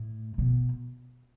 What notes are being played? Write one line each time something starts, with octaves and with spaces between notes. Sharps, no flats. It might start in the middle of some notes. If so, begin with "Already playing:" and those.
Already playing: A2
B2